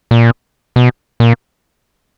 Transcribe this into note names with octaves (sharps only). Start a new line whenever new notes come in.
A#2
B2
A#2